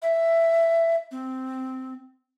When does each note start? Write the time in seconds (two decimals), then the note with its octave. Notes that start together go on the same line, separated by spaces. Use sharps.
0.02 E5
1.11 C4